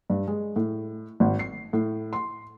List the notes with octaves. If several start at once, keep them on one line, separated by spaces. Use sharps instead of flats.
G2
G#3
A2
G#1
C7
A2
C6